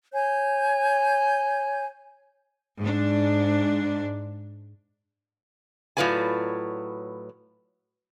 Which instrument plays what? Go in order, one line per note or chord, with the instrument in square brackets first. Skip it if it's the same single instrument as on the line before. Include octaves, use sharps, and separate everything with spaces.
[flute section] C#5 G#5 G6
[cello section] G#2 D4
[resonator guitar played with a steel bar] A2 F#3 F4 B4 D5 G#5